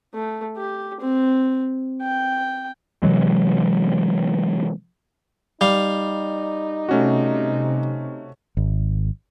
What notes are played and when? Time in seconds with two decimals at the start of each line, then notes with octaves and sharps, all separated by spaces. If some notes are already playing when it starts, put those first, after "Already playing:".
0.14 A3
0.57 G4
1.00 C4
2.02 G5
3.03 C3 E3 F#3 G#3
5.61 G3 D#4 F5
6.89 C3 A3 C#4 F#4
8.57 G#1